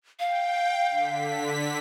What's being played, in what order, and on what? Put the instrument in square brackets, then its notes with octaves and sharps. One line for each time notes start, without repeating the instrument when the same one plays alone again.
[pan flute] F5 [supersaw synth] G5
[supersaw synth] D3 B6